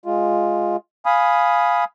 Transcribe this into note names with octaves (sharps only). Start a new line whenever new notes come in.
G#3 F4
F5 G#5 B5 D#6